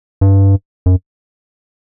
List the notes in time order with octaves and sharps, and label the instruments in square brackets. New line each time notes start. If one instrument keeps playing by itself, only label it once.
[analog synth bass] G2
F#2